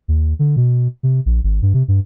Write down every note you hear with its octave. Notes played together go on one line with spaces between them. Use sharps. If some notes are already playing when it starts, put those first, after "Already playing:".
D#2
D3
B2
C3
A#1
G#1
G2
C3
G2